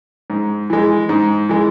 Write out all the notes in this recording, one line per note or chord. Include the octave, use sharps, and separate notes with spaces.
G#2
E3 G#3
G#2
E3 G#3